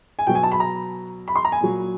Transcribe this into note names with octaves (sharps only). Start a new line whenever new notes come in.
G#5
B2 F#3 G5
G#5
A5
B5
A#5
B5
C6
A#5
G#5
A#2 F#3